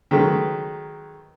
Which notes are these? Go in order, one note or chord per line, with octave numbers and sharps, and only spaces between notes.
D#3 F#3 G#3 A3 B4